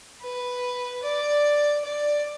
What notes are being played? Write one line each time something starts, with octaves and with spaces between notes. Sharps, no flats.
B4
D5
D5